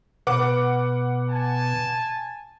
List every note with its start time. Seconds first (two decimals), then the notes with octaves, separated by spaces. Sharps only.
0.27 B2 B4 F#5 D6
1.29 G#5 A5